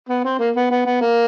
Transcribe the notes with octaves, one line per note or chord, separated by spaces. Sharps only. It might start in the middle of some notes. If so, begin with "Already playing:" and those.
B3
C4
A#3
B3
B3
B3
A#3